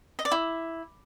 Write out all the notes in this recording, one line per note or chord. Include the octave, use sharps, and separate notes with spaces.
D#5
D5
E4